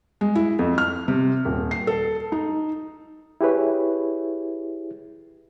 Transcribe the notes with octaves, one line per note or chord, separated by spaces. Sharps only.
G#3
E4
F2
F6
C3
D#1
C7
A4
D#4
E4 G4 G#4 B4 C#5